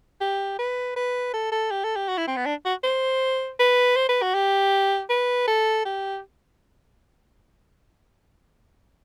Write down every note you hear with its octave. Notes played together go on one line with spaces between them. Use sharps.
G4
B4
B4
A4
A4
G4
A4
G4
F#4
E4
C4
B3
D4
F#4
C5
B4
C5
B4
F#4
G4
B4
A4
G4